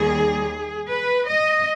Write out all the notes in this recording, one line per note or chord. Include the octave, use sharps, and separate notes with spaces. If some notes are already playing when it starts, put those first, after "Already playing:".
Already playing: D#2 D#3 G3 G#4
B4
D#5